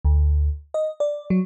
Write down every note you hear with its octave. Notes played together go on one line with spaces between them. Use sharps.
D2
D#5
D5
F#3